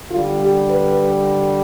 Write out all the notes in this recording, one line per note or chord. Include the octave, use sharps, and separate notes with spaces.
D3 G3 F4
G4
B4